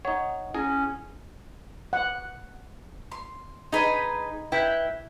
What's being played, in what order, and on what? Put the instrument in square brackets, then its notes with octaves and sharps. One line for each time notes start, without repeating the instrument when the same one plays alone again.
[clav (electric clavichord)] D#4 C#5 [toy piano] F#5
[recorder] C#4 [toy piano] E4 [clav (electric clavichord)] G#4
[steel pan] F#5
[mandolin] C6
[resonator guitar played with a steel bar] D#4 G#4 B4 [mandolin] D#5 A#5 B5
[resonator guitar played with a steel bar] E4 B4 G5